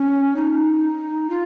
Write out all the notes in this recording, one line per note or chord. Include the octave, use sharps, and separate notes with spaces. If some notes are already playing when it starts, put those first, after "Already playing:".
Already playing: C#4
D#4
F4